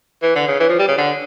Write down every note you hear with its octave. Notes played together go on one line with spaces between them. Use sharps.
E3
D3
C#3
E3
F3
G3
C#3
D3